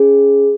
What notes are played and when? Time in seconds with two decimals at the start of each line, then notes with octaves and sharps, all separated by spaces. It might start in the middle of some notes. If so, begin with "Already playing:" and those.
Already playing: C#4 G#4